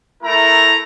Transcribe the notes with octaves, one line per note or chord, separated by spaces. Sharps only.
A3 E4 A#4 A#5